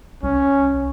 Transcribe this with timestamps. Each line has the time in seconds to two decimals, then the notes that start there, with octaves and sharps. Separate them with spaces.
0.23 C2 C#4